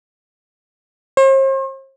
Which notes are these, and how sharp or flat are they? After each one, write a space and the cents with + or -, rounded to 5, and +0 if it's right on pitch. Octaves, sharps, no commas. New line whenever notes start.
C5 +45